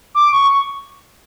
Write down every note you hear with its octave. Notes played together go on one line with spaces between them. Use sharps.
D6
C#6